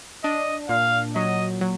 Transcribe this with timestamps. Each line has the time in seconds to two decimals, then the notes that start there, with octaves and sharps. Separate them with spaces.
0.24 D4 D#5
0.69 A#2 F5
1.15 F#3 D#5
1.61 F#3